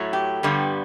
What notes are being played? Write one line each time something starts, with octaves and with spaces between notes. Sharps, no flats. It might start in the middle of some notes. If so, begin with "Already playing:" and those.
Already playing: A2 F#3 A3
G4
G2 D3 G3 B3